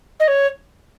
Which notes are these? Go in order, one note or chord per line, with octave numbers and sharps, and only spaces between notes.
D#5
C#5